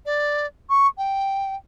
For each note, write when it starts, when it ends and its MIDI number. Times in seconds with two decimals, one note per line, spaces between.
0.06 0.46 74
0.70 0.87 85
0.98 1.55 79